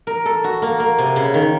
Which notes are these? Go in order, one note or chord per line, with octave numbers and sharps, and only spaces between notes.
A#4
A4
F#4
A#3
A#3
C3
C#3
D#3